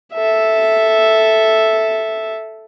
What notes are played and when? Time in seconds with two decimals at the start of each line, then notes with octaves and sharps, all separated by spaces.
0.14 A4 E5